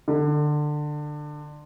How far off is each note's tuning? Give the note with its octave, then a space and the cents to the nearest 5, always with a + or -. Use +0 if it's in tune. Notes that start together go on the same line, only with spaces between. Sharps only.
D3 +20